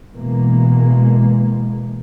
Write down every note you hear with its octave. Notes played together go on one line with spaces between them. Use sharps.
B2 E3 G#3 A#3